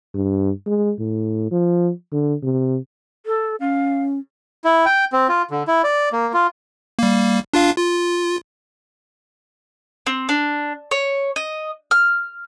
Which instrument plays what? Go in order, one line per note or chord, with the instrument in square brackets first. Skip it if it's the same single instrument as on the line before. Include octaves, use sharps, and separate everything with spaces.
[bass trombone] G2
G#3
A2
F3
D3
C3
[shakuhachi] A4
[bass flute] C#4 [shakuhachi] F5
[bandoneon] E4
G5
C4
F4
D3
E4
D5
A#3
F4
[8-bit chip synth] G3 A#3
D4 F4 F5
F4
[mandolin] C4
D4
C#5
D#5
F6